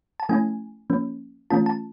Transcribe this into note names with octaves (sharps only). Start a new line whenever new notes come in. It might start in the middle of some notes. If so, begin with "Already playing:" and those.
A5
F3 A3 C#4 E4 G#5
F3 A#3 C#4
E3 A3 C#4 F4 A5
A5